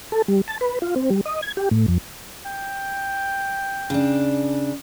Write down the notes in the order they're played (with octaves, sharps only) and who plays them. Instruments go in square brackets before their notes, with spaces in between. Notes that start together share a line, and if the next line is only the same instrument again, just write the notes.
[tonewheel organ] A4
G3
A5
B4
F4
C4
G3
D#5
G#6
G4
A2
F2
[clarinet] G5
[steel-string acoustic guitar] C#3 D4